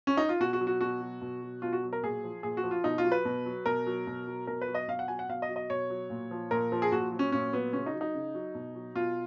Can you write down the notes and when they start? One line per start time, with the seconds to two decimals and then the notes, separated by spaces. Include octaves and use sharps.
0.07 C#4
0.17 D#4
0.29 F4
0.40 B2 F#4
0.53 F#4
0.61 F#3
0.67 F#4
0.81 B2 F#4
1.01 F#3
1.21 B2
1.42 F#3
1.62 B2 F4
1.73 F#4
1.83 F#3
1.93 A#4
2.03 A#2 G#4
2.24 F3
2.43 A#2 G#4
2.57 F#4
2.64 F3
2.71 F4
2.84 B2 D#4
2.98 F4
3.05 F#3
3.12 B4
3.25 B2
3.46 F#3
3.66 B2 A#4
3.86 F#3
4.07 B2
4.27 F#3
4.47 B2 A#4
4.61 B4
4.68 F#3
4.75 D#5
4.88 B2 F5
4.99 F#5
5.08 F#3 G#5
5.19 F#5
5.29 B2 F5
5.42 D#5
5.49 F#3
5.56 D#5
5.70 B2 C#5
5.90 F#3
6.10 A#2
6.31 F3
6.51 A#2 A#4
6.72 F3
6.82 G#4
6.92 A#2 F#4
7.12 F#3
7.19 C#4
7.32 A#2 C#4
7.53 F#3 B3
7.73 C#3 C#4
7.86 D#4
7.94 F#3
8.01 D#4
8.14 C#3
8.34 F#3
8.55 B2
8.75 F#3
8.95 B2 F4